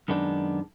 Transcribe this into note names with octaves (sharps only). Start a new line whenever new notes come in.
F#2 D#3 G#3 B3 D4